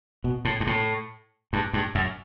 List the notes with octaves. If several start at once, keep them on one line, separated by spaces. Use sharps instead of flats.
B2
A2
G2
A2
G2
G2
F#2